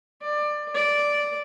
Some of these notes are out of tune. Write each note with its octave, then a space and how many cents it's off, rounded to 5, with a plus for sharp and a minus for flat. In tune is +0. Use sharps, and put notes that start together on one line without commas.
D5 +20
D5 -5